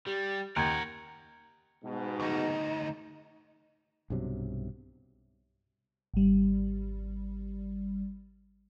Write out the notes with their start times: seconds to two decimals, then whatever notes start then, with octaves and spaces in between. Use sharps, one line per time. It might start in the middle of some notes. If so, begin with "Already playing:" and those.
0.07 G3 G4
0.56 D#2 A#4 F#5 A#5 G#6
1.84 G#2 B2
2.20 D2 D#4
4.10 B1 G2 C3 F#3
6.14 G#1 G3